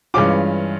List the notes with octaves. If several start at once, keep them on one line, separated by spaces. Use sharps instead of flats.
G2 E3 G#3 C#4 F4 D6